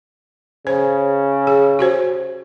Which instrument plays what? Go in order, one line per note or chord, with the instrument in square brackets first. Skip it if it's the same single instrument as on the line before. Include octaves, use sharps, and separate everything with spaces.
[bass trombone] C#3 [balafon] C5
[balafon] G#4
F#4 G4 C5